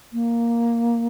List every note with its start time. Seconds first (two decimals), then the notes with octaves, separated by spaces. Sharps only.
0.13 A#3